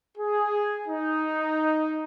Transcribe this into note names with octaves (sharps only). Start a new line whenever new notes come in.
G#4
D#4